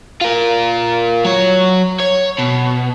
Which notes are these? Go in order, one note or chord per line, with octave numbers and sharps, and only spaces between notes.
F4 A#4
F#3 C#5
C#5
B2